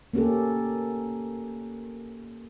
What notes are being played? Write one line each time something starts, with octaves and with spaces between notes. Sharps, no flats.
A#3 C#4 G4 A4